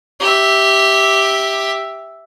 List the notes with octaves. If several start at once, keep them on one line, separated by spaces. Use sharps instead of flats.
G4 E5